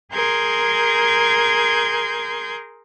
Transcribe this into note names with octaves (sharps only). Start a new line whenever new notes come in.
G#4 A#4 C6 G6 G#6